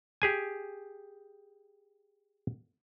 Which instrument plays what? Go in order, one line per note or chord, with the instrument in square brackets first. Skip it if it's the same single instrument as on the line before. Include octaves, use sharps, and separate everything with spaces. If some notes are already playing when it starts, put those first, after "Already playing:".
[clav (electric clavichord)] G4 G#4 G#5